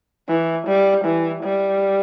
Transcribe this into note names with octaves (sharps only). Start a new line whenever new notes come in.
E3
G3
E3
G3